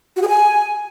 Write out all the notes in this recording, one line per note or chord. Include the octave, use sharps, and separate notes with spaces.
F#4
G#4
G#5